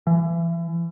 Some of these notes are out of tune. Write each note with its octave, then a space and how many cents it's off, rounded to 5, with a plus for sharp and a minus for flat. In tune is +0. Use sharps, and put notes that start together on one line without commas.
E3 +30